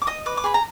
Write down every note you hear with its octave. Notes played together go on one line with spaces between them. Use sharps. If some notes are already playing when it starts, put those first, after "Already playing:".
D6
D#5 D#6
B4 D6
D6
G#4 B5
A#5